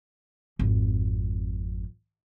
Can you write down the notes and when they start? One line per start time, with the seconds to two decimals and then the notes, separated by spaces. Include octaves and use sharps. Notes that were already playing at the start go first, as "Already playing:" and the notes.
0.59 G#1 F2